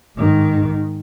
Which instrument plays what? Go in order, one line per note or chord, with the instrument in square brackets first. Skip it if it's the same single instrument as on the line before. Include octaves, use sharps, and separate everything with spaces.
[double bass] G#2 D#3